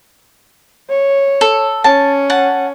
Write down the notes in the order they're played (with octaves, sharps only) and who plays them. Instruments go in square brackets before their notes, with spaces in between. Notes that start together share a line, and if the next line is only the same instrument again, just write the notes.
[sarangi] C#5
[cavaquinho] A4
[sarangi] C#4 [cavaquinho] A5
[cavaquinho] F#5 A5